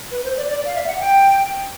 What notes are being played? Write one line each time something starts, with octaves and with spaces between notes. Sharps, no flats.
B4
C5
D5
D5
F5
E5
F#5
G5